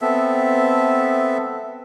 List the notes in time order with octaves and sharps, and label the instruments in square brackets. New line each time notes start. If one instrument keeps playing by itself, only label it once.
[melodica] B3 C4 A4 E5